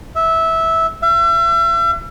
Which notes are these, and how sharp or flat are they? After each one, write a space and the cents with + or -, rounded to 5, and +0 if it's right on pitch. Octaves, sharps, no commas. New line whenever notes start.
E5 -15
E5 +40